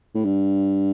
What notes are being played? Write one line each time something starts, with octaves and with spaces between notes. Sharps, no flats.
A2
G2